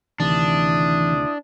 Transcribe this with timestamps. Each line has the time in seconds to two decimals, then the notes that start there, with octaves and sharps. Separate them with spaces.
0.20 D2 C3 D#3 E3 D4 E4 D#6